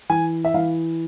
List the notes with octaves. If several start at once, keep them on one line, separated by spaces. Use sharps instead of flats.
E3 G#5
E5
E3 F5